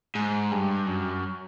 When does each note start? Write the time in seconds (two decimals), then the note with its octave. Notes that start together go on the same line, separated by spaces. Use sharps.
0.15 G#2
0.52 G2
0.87 F#2